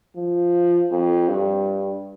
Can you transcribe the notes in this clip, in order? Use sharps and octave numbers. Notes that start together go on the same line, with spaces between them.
F3
F2
G2